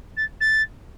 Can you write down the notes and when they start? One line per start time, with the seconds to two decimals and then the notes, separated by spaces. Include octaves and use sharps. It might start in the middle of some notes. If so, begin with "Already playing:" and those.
0.16 A6
0.40 A6